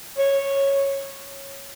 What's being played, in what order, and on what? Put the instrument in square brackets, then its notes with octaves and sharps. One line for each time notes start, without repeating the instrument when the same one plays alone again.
[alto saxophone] C#5